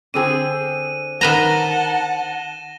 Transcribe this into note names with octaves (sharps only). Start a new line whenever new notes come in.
D3 C4 G#4 D#7
D#3 B4 F#5 A5 A#5 A#6 E7 G7